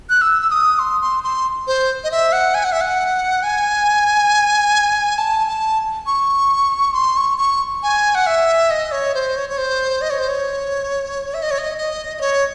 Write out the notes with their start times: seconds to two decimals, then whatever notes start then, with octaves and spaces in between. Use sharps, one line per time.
0.10 F#6
0.21 E6
0.42 E6
0.50 D#6
0.79 C6
1.01 C6
1.24 C6
1.67 C5
2.04 D#5
2.11 E5
2.33 F#5
2.54 G#5
2.64 F#5
2.72 E5
2.81 F#5
3.43 G#5
5.18 A5
5.47 A5
6.07 C#6
6.94 C6
7.17 C#6
7.38 C#6
7.83 G#5
8.15 F#5
8.27 E5
8.71 D#5
8.92 C#5
9.15 C5
9.36 C#5
9.50 C#5
9.58 C5
10.01 D#5
10.10 C#5
10.19 C5
10.28 C#5
11.34 E5
11.43 D#5
11.51 C#5
11.58 D#5
11.78 D#5
12.17 D#5
12.21 C#5